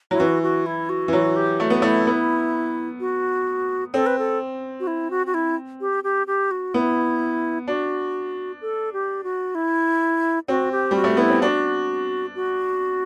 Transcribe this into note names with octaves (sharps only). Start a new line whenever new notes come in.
F#3 E4
E3 F#4
F#4
E4
F#4
E3
F#3 F#4
G4
A3 F#4
B3
A3 E4
B3
F#4
C4 A4
B4
A4
F#4
E4
F#4
F#4
E4
G4
G4
G4
F#4
B3 E4
D4 F#4
A4
G4
F#4
E4
C4 F#4
G4
G3 F#4
A3
B3 E4
C4
D4 F#4
F#4